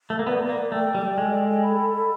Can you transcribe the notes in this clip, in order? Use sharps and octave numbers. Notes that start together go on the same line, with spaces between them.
A3
A#3
B3 D5
A#3
A3 G5
G3
G#3 A4
B5